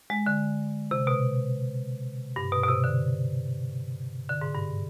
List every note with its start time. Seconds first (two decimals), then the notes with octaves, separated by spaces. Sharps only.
0.10 G#3
0.26 D3
0.91 C3
1.07 B2
2.36 G2
2.52 B2
2.63 B2
2.69 C3
2.84 D3
4.30 D3
4.41 G#2
4.54 G2